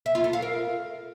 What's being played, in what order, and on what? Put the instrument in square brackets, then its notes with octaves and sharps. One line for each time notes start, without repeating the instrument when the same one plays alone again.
[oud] E5
F4
A4
F5
A#4